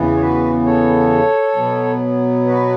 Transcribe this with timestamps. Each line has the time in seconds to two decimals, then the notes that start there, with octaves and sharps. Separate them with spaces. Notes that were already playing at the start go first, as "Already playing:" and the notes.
Already playing: E2 C#3 E3 B3
0.15 C#5
0.20 F#4 B4
0.65 A4 C#5
1.56 B2 F#3 B3
2.46 F#4 B4